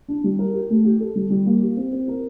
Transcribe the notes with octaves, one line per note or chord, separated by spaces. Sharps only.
D4
G3
A#4
G4
A3
G4
A4
G3
G3
A#3
G4
C4
C4
A#4